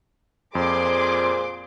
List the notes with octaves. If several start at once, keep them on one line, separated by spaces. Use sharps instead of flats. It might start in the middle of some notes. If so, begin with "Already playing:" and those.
F2 A#2 G#4 C5 C6 D6